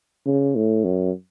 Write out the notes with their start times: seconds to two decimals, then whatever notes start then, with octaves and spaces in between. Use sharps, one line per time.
0.26 C#3
0.56 A2
0.84 F#2